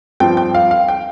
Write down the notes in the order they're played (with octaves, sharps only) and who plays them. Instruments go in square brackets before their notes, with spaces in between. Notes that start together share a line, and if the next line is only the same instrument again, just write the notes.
[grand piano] G2 F3 C4 G5
G5
F5
F5
G5